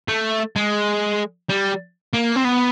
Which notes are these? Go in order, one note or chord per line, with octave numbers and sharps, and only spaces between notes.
A3
G#3
G3
A#3
C4
B3